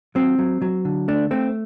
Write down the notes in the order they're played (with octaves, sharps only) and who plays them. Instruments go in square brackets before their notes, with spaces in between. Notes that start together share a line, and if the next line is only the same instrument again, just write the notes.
[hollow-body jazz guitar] F#3 C4
F#3
F#3
D3
A3 D4
A3 C4